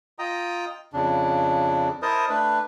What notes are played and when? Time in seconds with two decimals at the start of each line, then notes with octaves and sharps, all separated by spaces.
0.19 F4 D#5 G5 A#5 D#6
0.93 F2 C#3 D4
2.02 E4 A#4 C5 D#5 A5 D#6
2.29 A3 D4 B4